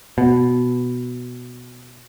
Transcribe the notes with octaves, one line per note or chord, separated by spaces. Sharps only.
B2